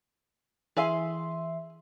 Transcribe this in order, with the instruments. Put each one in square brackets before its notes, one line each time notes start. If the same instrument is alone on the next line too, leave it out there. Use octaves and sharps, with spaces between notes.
[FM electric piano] E3 E5 C6 [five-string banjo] G#4 F5 G#5